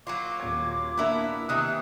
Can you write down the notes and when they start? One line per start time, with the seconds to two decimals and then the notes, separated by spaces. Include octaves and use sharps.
0.07 F#3 A#3 F4 D6
0.40 D#1 G#6
0.98 A#3 B3 D4 E4 A#5
1.49 C3 D#3 E3 D#6 F#6